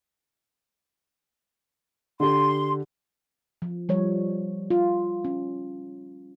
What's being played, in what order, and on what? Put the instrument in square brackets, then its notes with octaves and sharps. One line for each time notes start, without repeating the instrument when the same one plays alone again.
[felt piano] D3 G4 [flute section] C6
[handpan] F3
F3 G3 C#5
F4
C#4